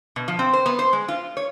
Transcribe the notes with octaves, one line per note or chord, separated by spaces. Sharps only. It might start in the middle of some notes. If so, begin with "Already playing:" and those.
B2
F3
C4
C5
B3
C5
G#3
F4
C#5